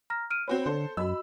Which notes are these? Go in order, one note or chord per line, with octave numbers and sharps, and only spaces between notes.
A#5 F6 A#6
F6 D7 D#7
C4 F#4 B4 C#5
D3 A4 C5
F#2 F#4 D#5 B5 E6